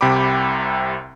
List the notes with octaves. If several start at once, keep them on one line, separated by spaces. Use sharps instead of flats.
C2 C3 G5 B5 D6